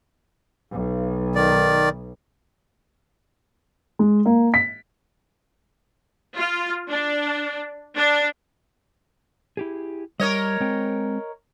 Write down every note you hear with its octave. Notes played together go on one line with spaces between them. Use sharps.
B1
D#3 D5
G#3
A#3
B6
F4
D4
D4
E4 G4 G#4
G3 A#4 C#5 D#5
G#3 C4